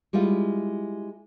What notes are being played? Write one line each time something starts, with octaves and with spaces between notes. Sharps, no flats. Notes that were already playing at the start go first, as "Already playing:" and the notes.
G3 G#3 E4 F4